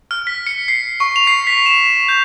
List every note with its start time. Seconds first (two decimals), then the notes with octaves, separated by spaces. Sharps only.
0.11 F6
0.27 B6
0.47 C#7
0.68 C7
1.00 C#6
1.16 F7
1.27 C7
1.47 B6
1.66 E7
2.08 G6